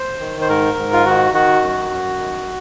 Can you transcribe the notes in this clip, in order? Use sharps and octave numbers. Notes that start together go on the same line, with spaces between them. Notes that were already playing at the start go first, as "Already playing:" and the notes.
Already playing: C5
D#3
C5
G#2 A#4
G#2
F4
D#3 F#4
D#3 F#4
F#2
F#2
D#3